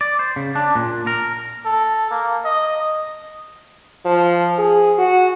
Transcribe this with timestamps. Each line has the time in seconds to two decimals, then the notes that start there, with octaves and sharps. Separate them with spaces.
0.01 D5
0.19 C5
0.36 C#3
0.55 D4
0.75 A#2
1.07 A#4
1.65 A4
2.11 A#3
2.45 D#5
4.05 F3
4.59 G#4
4.98 F#4